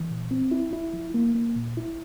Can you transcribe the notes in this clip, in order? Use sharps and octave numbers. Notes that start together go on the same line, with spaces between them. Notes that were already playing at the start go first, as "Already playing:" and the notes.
Already playing: E3
A#2
C4
E4
E4
F3
A#3
A#3
A#2
E4